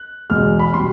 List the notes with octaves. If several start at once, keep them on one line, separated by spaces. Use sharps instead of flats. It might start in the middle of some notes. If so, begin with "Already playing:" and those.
Already playing: F#6
E1 E2 B2 G#3 F6
B5
B2 G3 C6